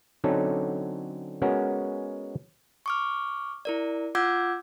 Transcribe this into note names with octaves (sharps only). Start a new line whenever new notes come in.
D3 F#3 C4 C#4 D#4 A4
G#3 B3 C#4 F#4 A#4
C#6 D6 F6
E4 A#4 D5
F4 F#5 D6 E6 G6 G#6